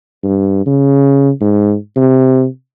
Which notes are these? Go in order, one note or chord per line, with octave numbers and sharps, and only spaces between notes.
G2
C#3
G#2
C3